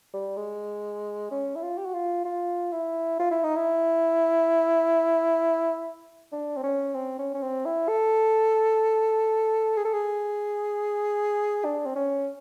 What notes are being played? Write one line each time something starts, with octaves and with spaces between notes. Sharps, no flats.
G3
G#3
C#4
E4
F4
G4
F#4
F4
F4
E4
F4
E4
D#4
E4
D4
C4
C#4
C4
C#4
C#4
C4
E4
A4
G#4
A4
G#4
D4
C4
C#4